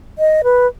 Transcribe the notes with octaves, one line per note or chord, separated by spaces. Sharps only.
D#5
B4